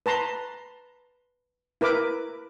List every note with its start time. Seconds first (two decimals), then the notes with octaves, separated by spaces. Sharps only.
0.06 B4 A5 A#5 C6
1.81 E4 A#4 B4 D6